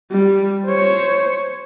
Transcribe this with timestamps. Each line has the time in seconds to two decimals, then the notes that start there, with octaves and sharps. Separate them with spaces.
0.11 G3
0.66 C5 C#5